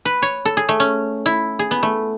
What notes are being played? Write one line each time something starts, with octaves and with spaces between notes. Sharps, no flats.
B4
C#5
A4
G#4
A3
C#4
E4
G#4
B3
A3